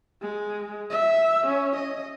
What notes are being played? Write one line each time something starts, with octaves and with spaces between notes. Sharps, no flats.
G#3
E5
C#4
D#5